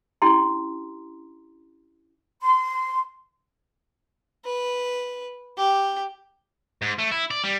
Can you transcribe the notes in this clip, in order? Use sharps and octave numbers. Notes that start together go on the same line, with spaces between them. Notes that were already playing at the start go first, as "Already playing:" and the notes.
C#4 D4 E4 G4 A#5 C6
C6
B4
G4
G#2
A3
E4
D5
G3